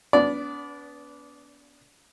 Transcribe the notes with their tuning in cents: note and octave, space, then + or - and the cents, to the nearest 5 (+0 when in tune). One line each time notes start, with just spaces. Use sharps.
B3 +5 D4 -40 D5 -15